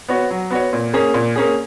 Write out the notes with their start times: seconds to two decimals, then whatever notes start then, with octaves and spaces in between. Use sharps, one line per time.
0.09 B3 F#4 C#5
0.30 F#3
0.51 B3 F#4 C#5
0.73 A#2
0.94 A#3 C#4 G#4
1.14 A#2
1.36 A#3 C#4 G#4